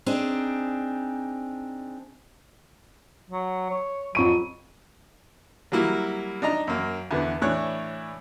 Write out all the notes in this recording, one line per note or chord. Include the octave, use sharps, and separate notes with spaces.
C4 D4 D#4 G#4
F#3
C#5
F2 F#3 C#6 D#7
F#3 G3 A#3 E4
D4 D#4 D#5 A#5
F#2 A#3
E2 D3 B3
A2 E3 D4 C#5 F#6